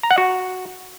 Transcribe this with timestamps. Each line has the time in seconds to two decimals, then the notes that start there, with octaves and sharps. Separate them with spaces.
0.03 A#5
0.11 F#5
0.18 F#4